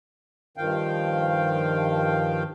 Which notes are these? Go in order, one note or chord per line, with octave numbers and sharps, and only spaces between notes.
G2 D#3 F3 F5 G5